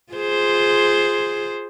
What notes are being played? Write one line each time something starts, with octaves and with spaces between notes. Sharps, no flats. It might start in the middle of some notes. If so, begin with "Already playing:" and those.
F4 G#4 C5